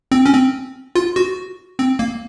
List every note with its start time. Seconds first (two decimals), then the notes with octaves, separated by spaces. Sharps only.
0.12 C4
0.26 C#4
0.33 C4
0.95 F4
1.16 F#4
1.79 C4
1.99 A#3